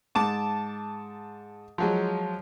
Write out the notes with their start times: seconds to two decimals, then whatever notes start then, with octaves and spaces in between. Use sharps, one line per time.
0.15 G#2 A5 D6
1.78 F3 F#3 G#3